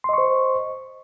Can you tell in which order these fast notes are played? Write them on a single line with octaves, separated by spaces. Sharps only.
C6 D#5 C#6 C5